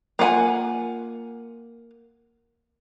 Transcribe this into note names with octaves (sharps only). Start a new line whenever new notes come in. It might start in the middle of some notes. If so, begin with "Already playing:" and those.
A#3 F4 F#5 G#5